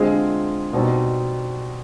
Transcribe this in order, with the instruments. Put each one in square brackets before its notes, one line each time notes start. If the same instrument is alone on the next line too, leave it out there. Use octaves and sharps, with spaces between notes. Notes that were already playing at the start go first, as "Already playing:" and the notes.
Already playing: [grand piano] D3 G#3 C4 F4 G#4
B2 G3 C4 D#4